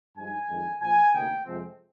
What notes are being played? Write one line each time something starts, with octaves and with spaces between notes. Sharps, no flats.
G2 F3 G#3 D#4 G#5
F2 D#3 G#3 D4
A#1 A#2 F3 G#5
D2 C3 D#3 A#3 D#4 G5
F2 C3 F3 G#3 C4